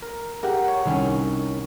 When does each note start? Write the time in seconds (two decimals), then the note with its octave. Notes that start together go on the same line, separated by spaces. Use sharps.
0.02 A#4
0.43 G4 A#4 F#5
0.68 C#5
0.86 C2 D#3 C#4